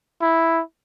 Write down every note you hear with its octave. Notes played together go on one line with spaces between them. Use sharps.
E4